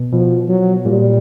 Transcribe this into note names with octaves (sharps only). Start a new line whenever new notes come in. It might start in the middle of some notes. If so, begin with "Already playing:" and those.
Already playing: B2
B2 F3
F#3
A#2 G3